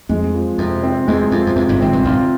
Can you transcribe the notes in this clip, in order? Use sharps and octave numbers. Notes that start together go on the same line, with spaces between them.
F2 G#3
F3
F2 C3
C4
E2 G#3
F2 F3
F2
E2 C3
G1 G2
G#1 G#2 C4
G1 G2
G1 G2 F4